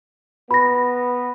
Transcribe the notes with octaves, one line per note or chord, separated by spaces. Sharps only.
B3 B5 A#6